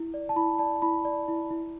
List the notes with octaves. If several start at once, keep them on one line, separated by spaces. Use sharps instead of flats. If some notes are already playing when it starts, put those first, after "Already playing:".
Already playing: E4
D5
A5
E4 B5
D5 A5
E4 B5
D5
E4
E4